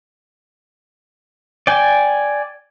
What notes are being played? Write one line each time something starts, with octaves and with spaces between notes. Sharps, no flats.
D5 G5 G#5